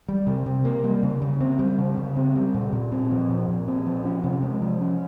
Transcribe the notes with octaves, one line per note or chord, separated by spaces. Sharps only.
G3
C3
C3
A#3
G3
C#3
C#3
C4
G3
C#3
C#3
C4
G3
A#2
A#2
C4
F3
A#2
A#2
C4
F3
C#4
C3
G#3
F3
C#4